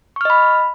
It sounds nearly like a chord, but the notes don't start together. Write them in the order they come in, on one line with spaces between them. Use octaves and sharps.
C#6 F6 D#5 B5